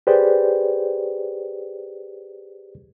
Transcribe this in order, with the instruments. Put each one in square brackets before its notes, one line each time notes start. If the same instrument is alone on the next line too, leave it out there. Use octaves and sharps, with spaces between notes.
[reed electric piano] G4 G#4 B4 C5 D5